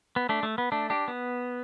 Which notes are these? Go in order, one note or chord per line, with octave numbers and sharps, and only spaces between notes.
B3
A3 D4
A3
B3
A3 D4
D4 G4
B3